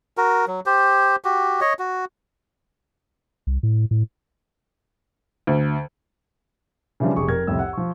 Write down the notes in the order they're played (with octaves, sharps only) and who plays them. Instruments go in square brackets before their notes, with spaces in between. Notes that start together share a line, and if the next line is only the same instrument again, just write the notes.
[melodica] F#4 A#4
F#3
G4 C5
F#4 G4
C#5 D#5
F#4
[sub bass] C2
A2
A2
[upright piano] D2
[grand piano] C#3 E3 F3 G3 D4
F1 G4 G#4 C#6
F2 A#4 G#6
C2 F2 A2 E6
F#5
F3 C#6